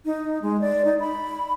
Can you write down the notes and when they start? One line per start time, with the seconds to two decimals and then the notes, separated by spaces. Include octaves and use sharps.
0.05 D#4
0.42 G#3
0.61 D5
0.85 D#4
1.00 B5